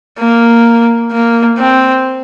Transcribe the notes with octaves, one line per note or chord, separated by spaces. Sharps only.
A#3
A#3
C4